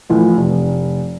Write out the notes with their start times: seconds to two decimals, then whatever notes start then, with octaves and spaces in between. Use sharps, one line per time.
0.09 A2 E3 F3 D#4
0.37 F1